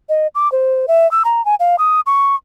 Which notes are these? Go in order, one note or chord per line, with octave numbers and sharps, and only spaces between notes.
D#5
D6
C5
E5
E6
A#5
G#5
F5
D#6
C#6